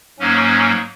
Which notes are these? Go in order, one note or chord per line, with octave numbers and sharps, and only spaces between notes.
G#2 F#3 A#3 C#4